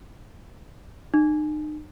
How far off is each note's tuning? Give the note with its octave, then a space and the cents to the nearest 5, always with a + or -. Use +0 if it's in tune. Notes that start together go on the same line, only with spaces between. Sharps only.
D#4 -40